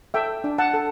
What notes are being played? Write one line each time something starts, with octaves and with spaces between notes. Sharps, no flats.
A4 E5 G5
D4
F#5 A5
A4